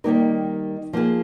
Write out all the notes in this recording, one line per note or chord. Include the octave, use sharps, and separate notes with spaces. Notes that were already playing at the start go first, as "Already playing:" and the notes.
D#3 G3 A#3 D#4 A#4
F3 A#3 F4 G#4